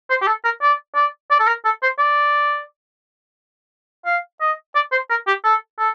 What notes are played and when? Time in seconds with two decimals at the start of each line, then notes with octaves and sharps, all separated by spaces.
0.10 C5
0.22 G4
0.27 A4
0.45 A#4
0.62 D5
0.95 D5
1.31 D5
1.40 A4
1.47 A#4
1.65 A4
1.83 C5
1.99 D5
4.06 F5
4.41 D#5
4.76 D5
4.92 C5
5.10 A#4
5.27 G4
5.44 A4
5.79 A4